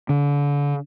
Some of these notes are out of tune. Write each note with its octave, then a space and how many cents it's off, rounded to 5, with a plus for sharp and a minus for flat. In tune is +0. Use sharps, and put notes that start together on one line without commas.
D3 -35